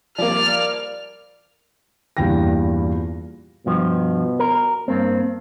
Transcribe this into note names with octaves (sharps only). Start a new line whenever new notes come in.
F3 G3 A#3 D5 F6
E2 G2 A#2 E3 G5 A#6
G2 B2 F3
A#4
G2 A#3 C4